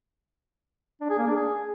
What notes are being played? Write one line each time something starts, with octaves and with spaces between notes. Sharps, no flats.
D4
G#4
A#3
D4
G#4